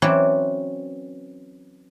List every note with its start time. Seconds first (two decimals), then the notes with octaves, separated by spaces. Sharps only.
0.02 E3 F#3 C4 C#4 B4 D5